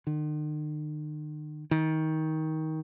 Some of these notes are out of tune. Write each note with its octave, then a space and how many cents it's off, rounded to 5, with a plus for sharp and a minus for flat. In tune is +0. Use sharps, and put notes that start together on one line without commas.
D#3 -45
D#3 +20